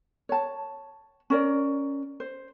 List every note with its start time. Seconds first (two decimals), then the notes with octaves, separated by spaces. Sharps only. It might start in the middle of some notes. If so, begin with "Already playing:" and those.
0.29 C#5 A5
1.30 C#4 A#4 D5
2.20 C5